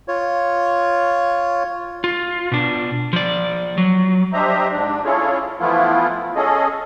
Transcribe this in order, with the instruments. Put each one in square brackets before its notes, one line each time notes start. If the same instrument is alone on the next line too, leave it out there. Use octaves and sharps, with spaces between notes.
[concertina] F4 C#5
[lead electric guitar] F4
B2 D4
F3 D5
F#3
[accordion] D4 G4 C5 D#5 E5 A#5
G#2 D4
C#4 E4 F4 G#4 A4 C#5
E3 F3 A3 B3 E4 F4
C#4 G#4 A4 D#5